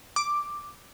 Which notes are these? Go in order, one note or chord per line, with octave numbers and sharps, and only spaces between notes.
D6